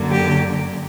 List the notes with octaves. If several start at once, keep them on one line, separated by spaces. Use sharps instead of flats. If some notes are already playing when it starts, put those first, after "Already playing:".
Already playing: F#2 D3 F#3 A#3
G4